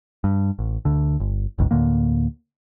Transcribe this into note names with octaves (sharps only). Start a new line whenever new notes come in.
G2
A1
D2 D3
G1
F#1 C#2 G#2
D2 A2 D3 A#3